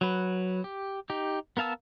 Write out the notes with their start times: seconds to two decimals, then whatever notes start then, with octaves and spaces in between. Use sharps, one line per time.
0.01 F#3 B4
0.64 G4
1.10 D#4 G4
1.57 B3 A#4 F5 A5 E6